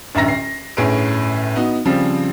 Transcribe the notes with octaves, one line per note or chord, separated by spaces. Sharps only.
D1 A1 G2 E5 A#5 A#6
C7
G1 A2 C#4 G#4 B4 D7
B3 D#4 F#4
C#3 F3 G3 C4